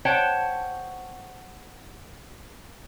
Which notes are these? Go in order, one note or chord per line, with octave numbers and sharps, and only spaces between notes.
C5 C#5 F#5 G5 A5